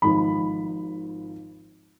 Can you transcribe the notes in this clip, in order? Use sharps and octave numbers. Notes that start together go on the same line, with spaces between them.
G#1 G#2 F3 B5